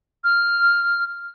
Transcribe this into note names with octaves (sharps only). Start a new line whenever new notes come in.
F6